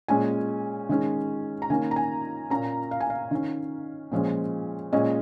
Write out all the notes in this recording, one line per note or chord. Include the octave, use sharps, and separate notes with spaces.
A#2 G#3 C#4 G#5
D#3 G#3 C#4
A#5
D#3 A#3 C#4 G#5
A#5
G#5
A#2 A#3 C#4 A#5
F5
G#5
F5
D#3 C#4
A#2 F3 G#3 C#4
A#2 G#3 C#4 D#5